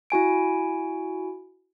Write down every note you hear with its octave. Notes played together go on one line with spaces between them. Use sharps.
E4 F#4 G#5 D7